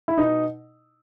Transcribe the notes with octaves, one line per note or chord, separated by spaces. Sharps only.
E4
B2 D#4